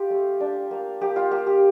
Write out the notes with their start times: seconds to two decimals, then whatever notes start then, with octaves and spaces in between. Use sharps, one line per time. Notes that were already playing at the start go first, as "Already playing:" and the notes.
Already playing: F4 G4
0.10 A3
0.40 D4
0.71 A#3
1.01 A#3 G4
1.16 F4
1.31 A#3 G4
1.46 G4